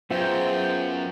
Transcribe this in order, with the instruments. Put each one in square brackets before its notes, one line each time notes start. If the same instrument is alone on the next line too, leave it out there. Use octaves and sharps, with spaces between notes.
[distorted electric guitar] F#2 [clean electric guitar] B3 F4 E5 [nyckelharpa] G#4 G5 [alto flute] C5